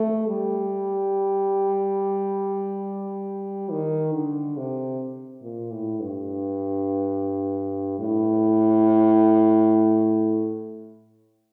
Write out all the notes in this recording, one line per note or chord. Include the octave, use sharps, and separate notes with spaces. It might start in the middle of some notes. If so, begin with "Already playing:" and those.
Already playing: A3
G3
D#3
D3
C3
A#2
A2
G2
A2